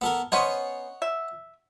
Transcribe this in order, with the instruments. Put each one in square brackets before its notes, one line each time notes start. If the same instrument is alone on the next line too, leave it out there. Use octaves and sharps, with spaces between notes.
[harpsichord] B3 A4 A#4
[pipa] B3 C#4 C5 [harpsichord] C#5 D#5 F#5
[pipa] E5